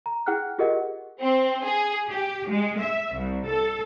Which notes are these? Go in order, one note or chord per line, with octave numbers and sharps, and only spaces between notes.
A#5
E4 G#4 F#5 G5 F6 F#6
F4 G4 G#4 A#4 D#5 F#5
C4
G#4
G4
G#3
E5
C2
A4